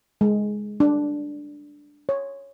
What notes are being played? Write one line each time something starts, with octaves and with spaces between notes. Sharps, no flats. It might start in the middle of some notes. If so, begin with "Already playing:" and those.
G#3
D4
C#5